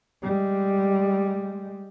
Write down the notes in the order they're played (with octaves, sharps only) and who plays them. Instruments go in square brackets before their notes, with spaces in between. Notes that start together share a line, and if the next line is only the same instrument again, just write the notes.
[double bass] G3 G#3